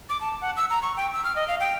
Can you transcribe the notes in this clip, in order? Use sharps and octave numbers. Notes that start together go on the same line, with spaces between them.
D6
A5
F#5
E6
A#5
C#6
G5
E6
F6
D#5
F5
G5